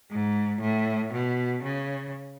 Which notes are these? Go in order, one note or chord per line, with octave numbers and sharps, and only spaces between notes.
G#2
A2
B2
C#3